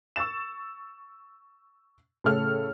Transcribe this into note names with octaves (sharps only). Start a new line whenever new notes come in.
C#6 E6 A6 E7
A2 C#3 A4 C#5 F6